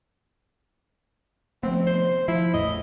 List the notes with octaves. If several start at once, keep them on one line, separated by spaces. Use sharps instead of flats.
F3 A3 B3 C4
C5
F3 E4
A1 E2 A2 D#5